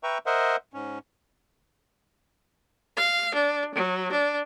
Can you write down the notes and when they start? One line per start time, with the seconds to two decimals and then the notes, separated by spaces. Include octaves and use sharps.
0.03 B4 E5 G5 A#5 C#6
0.26 A#4 C5 D#5 E5 F#5
0.74 G#2 C#4
2.97 F5
3.34 D4
3.74 F#3
4.11 D4